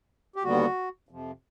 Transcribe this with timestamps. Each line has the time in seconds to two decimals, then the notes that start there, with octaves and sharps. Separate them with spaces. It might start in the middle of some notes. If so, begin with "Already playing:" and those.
0.36 G4
0.43 D#2 D3 G3 B3 F#4
1.09 F2 C3 F3